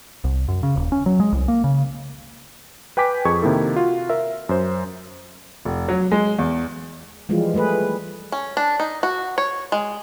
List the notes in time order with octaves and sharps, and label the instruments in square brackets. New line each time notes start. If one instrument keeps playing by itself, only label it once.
[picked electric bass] C2
F#2
C#3
D#1
C#4
F#3
G#3
C2
A#3
C#3
[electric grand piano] B4 G5 G#5 D6 B6
F2 G#4 C#6 G#6
C3 D#3 A#3 E4 A4
F4 F#4
A#4 E5
F#2 C5
[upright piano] F1
F#3
G#3
E2
[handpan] E3 F3 G3 G#3 F4
G3 A3 G#4 B4
[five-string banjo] C#4
D4
D#4
F#4
C#5
G#3